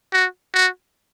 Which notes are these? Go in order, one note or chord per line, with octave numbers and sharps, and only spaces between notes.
F#4
F#4